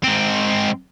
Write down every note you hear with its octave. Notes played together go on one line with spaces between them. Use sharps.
G#2 C4